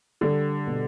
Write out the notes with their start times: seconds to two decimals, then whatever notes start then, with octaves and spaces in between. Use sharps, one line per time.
0.21 D3 G3
0.67 B2